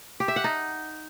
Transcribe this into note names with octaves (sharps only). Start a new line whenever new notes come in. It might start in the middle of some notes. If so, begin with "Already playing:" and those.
G4
E5
F#5
D#4